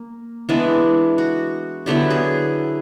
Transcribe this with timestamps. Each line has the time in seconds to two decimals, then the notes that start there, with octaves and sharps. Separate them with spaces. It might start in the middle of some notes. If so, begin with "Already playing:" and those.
Already playing: A#3
0.49 E3 G#3 B3 D4
1.18 F#4
1.86 D3 F#3 B3 E4 G4
2.10 G#4